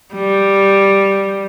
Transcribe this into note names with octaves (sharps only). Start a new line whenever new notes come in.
G3